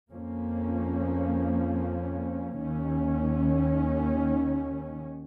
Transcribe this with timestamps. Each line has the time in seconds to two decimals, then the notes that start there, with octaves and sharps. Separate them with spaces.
0.12 F2 F3 A#3 C#4
2.59 D#2 D#3 C#4